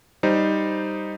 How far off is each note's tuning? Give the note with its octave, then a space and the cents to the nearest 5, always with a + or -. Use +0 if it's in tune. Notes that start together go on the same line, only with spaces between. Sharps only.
G3 +0 D#4 +0 C5 +0